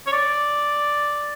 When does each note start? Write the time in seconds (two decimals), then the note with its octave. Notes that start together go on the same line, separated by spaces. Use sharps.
0.07 C#5
0.12 D5